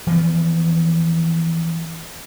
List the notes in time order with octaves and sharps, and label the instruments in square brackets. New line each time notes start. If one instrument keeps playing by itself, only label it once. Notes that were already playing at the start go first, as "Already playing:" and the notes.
[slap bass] E3 F3 B3